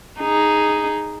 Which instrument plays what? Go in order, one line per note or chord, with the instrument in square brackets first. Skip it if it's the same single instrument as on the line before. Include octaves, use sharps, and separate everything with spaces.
[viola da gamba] D#4 G#4